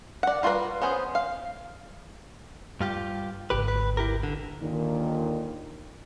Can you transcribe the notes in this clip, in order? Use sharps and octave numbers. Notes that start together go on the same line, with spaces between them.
D5 F#5
G3 F4 F#4 A#4 B4
B3 C#4 G#4 C5
F5
G2 F4 G4
G#1 D2 G4 B4
B4
E4 G4 A#4
D3
D#2 A#2 D3 D#3